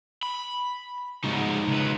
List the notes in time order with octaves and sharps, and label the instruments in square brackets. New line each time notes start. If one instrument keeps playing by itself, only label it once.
[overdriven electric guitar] B5
[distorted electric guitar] C#2 G#2 [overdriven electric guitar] D#4 F#4
[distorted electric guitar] C#2 B4